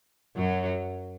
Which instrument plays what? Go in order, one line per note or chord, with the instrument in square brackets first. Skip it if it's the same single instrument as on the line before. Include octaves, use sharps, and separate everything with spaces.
[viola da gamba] F#2 F#3